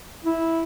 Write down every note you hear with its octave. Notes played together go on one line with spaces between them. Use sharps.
E4